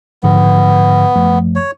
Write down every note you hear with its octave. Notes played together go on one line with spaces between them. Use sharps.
G#2 D3 F3 B3
F#2 F3 A3
C#5